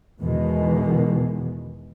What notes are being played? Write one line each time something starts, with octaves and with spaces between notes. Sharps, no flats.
E2 B2 D#3 E3 G#3